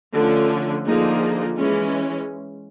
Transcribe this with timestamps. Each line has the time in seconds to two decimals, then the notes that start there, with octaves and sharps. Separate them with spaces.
0.12 D3 F3 A3 C#4
0.85 D3 F3 A#3 D#4 G#4
1.57 E3 G#3 C#4